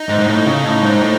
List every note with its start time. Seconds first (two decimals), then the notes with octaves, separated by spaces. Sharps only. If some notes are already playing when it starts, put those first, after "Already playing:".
Already playing: D#4
0.09 G#2
0.19 G#2
0.28 A2
0.46 C#3
0.64 A2
0.83 G#2
1.03 A2